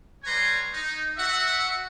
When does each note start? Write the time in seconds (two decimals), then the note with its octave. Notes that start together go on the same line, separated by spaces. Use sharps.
0.24 G3 B4 C#5 G#5 A#5 C6
0.73 D#4
1.17 F#4 E5 F#5